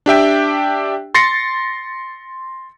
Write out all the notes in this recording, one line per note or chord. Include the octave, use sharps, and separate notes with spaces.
D4 G4 E5 G5
C6 A6 A#6 C7 C#7